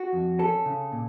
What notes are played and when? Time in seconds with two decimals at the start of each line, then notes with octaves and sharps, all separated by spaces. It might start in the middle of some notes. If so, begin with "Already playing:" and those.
Already playing: F#4
0.13 F2
0.39 C#4 A4
0.66 C#3
0.92 A#2